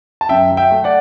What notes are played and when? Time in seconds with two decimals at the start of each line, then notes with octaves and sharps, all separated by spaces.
0.21 A5
0.29 F#2 E5 G5
0.51 F#3
0.57 E5 G5
0.71 A3
0.84 D5 F#5